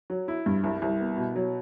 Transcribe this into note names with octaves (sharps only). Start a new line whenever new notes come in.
F#3
E4
G2
C2
C2
B3
B2
F#3